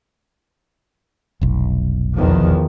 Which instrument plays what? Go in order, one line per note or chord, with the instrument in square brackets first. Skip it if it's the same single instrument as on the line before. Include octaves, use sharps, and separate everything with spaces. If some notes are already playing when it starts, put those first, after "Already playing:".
[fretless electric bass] F1 B1
[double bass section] E2 D#3 F3